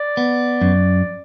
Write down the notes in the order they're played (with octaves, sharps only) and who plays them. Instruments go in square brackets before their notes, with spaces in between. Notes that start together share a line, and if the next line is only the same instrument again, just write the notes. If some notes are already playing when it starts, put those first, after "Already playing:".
Already playing: [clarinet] D5
[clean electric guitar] B3
F#2